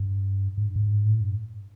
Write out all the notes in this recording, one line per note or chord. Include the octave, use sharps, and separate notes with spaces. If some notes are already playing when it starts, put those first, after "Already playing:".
Already playing: G2
G#2
G2
G#2
A2
G2